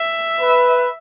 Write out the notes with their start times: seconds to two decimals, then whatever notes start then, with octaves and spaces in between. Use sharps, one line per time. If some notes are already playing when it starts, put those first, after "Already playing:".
Already playing: E5
0.40 B4